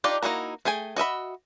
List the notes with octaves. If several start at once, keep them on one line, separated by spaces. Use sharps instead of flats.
D4 D#4 F4 G4 D5
A#3 D#4 E4 F#4 A#5
A3 G#4 G5 G#5
F#4 D#5 E5 B5